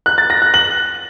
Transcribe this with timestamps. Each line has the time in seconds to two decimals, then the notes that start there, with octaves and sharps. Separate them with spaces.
0.06 F#6
0.18 A6
0.30 A#6
0.42 F#6
0.54 F#7